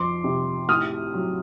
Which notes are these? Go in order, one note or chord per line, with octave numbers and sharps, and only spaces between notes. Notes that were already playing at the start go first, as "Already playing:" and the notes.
Already playing: F2 C6 D6
C3
A2 D#6 F6
F#3